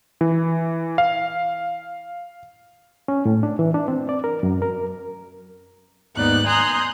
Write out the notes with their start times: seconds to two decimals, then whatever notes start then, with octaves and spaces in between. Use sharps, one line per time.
0.21 E3
0.98 F5
3.08 C#4
3.25 A2
3.43 D4
3.59 E3
3.74 D4
3.88 C4
4.09 D5
4.24 A#4
4.43 F#2
4.62 A#4
6.16 D#2 G#2 B3 D#4 D5 F#6
6.46 G#5 A#5 C6 D#6 F#6 G6